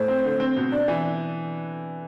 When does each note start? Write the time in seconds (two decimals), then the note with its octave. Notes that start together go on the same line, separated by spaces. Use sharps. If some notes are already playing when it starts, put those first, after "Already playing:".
Already playing: A2 C5
0.08 C4
0.25 D3
0.40 C4
0.57 B2
0.72 D4 D5
0.88 E3